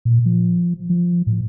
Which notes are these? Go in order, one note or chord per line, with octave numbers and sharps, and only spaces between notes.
A#2
F3
F3
A2